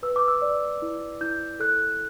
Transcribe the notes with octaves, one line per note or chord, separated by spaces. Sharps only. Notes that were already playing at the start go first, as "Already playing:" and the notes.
B4 E6
D6
E6
D5
E4
E4 G6
A4 F#6